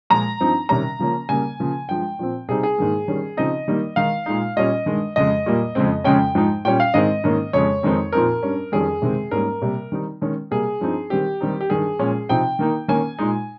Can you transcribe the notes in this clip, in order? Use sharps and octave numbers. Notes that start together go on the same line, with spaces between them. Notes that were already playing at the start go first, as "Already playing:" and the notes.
A#2 F3 G#3 A#5
G2 F3 C4 D#4
C3 D#3 G3 C#4 A#5
C#3 F3 A#3 C#4
C#3 G3 A#3 G#5
C#3 F3 A#3
G2 F3 G#3 G5
A#2 F3 C4
C3 G3 C4 D#4 G#4
G#4
G#2 D#3 A#3
D#3 G3 C#4
C#3 F3 C4 D#4 D#5
D#3 G3 A#3 D#4
D#3 G#3 D#4 F5
A#2 G#3 D#4
A#2 G3 C#4 D#5
G2 D#3 G#3
F2 C#3 G#3 D#5
A#2 G3 A#3
F2 C#3 G#3 C4
F2 C#3 G#3 C#4 G5
G#2 F3 G#3 D#4
A#2 G3 C#4 G5
F5
G#2 D#3 G#3 C4 D#5
G#2 D#3 A#3 C#4
F2 C#3 G#3 C#5
F2 D#3 G#3 C4 D#4
A#2 F3 C4 D#4 A#4
G2 G3 C#4
F2 D#3 G3 C#4 G#4
C3 D#3 G#3 C4
G#2 G3 A#3 C#4 A#4
C3 G3 A#3
D#3 G3 C4 D#4
D#3 G#3 C#4
C3 G3 A#3 G#4
G2 F3 C4 D#4
D#3 G3 C4 G4
D#3 G3 C4 D#4
G4
G2 D#3 G3 G#4
A#2 F3 G#3 C#4
C3 F3 C4 D#4 G5
D#3 A#3 D#4
D#3 A#3 C#4 G#5
A#2 G#3 D#4